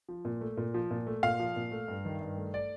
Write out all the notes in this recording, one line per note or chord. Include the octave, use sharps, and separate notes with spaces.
F3
A#2
A3
A#2
F3
A#2
A3
A#2 F5
F3
A#2
A3
G2
D#3
G2
A3
D5